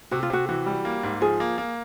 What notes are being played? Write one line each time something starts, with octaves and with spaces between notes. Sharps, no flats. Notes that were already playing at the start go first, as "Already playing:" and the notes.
C3 F#4
F4
C3 F#4
E3 F#4
G3
A#3
G#2
F3 G#4
A#3
A#3